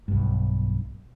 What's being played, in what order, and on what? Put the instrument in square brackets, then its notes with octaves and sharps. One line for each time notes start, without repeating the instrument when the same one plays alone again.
[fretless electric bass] B1 G2